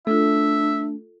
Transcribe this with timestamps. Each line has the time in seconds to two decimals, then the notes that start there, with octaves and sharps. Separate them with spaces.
0.07 A3 D4 F4 A4 E5